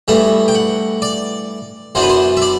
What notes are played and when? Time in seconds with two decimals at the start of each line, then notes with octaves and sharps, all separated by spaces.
0.08 G2 E3 A3 E5
0.48 G5
0.55 F#5
1.02 D5
1.95 F#2 E3 B3 D4 C5
2.02 B4
2.09 C5
2.37 E5
2.42 D5